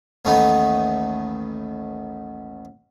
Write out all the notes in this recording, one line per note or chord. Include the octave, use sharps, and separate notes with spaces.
A1 D#2 A3 B3 D#4